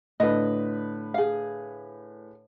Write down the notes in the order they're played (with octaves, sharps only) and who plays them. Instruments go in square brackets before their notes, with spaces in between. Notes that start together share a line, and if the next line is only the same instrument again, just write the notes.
[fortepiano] A2 D3 B4 [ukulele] D#5
[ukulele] G#4 F5